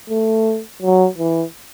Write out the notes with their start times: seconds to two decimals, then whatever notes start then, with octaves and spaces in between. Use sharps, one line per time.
0.10 A3
0.82 F#3
1.18 E3